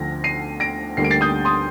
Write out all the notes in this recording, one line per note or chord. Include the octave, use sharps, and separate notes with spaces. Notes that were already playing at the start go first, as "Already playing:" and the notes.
Already playing: D2 D3 F3 A#6
C7 D#7
A#6 D7
D2 D3 G3 A#3 C7
D7
A6 C7
D#6 G6
C6 D#6